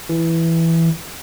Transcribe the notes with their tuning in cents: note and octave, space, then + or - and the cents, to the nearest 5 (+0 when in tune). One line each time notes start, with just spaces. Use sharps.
E3 +0